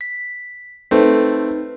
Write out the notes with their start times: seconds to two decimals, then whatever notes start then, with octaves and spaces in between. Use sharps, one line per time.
0.01 B6
0.91 A3 C4 D#4 B4